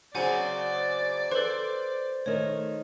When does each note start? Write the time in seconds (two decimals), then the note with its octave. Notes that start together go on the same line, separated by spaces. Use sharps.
0.15 C#3 F#3 C4 C5 D5 F#5 G#5
1.31 A4 B4 C5
2.26 D#3 A3 C#5